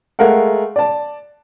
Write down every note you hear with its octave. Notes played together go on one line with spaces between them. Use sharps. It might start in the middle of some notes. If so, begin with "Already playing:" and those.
G#3 A3 A#4 F5 F#5
D5 A5